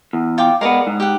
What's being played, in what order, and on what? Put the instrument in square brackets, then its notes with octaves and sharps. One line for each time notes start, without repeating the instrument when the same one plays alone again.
[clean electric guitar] E2
[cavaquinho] F4 G5 D6
[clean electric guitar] G#3 B3 [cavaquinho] A#4 D5
[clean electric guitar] G#2
[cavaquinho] G4 F#5